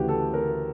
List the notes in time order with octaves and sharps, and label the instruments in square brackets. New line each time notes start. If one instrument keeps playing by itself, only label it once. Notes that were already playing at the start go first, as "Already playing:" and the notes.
Already playing: [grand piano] D2 C#3 E3 F#4 G4
A4
A#4